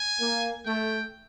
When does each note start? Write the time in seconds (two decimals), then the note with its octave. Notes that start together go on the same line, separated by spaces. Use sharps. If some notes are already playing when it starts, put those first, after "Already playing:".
Already playing: G#5
0.20 A#3
0.66 A3 G5